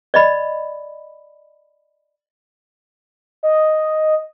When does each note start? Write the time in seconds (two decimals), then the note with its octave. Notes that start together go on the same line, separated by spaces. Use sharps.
0.14 D5 D#5 B5
3.43 D#5